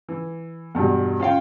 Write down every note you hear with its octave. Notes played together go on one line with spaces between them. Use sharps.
E3
E2 G2 B2
C#4 F4 F5 G5